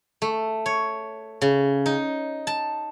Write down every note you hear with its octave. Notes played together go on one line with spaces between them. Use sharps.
A3
C#5
C#3
D#4
A5